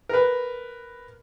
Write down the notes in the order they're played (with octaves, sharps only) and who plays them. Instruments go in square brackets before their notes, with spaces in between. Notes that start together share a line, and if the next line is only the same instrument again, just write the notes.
[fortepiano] A#4 B4